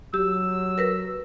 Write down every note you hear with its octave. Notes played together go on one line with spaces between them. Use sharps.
F#3 G4 E6
A#4 B4 A#6